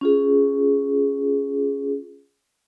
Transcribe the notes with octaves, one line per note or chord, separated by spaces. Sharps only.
C#4 F4 G#4